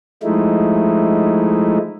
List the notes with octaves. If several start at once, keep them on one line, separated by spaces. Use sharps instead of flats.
F3 G#3 A3 D#4 E4